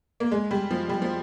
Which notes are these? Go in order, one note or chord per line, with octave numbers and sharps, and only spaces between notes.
A#3
G#3
G3
F3
G3
F3